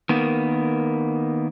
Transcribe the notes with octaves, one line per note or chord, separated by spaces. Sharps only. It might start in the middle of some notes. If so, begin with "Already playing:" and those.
D#3 A#3 B3